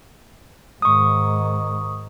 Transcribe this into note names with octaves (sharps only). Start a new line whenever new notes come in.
G#2 D#3 C#6 D#6